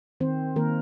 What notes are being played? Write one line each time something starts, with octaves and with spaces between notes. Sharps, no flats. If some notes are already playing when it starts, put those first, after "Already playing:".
D#3 C4 C5
D#3 A#3 A#4